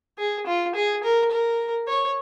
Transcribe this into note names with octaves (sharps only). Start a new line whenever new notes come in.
G#4
F4
G#4
A#4
A#4
C#5